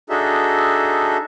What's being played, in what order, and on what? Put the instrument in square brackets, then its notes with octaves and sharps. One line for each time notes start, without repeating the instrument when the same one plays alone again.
[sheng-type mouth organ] D4 D#4 F#4 G#4 A4 E5